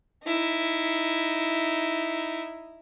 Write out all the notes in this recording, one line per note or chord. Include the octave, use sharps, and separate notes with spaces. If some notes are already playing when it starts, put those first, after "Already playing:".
D#4 E4